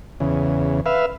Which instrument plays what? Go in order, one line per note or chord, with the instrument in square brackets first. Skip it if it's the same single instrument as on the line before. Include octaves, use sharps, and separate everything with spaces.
[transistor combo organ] E2 C#3
B4 E5 F5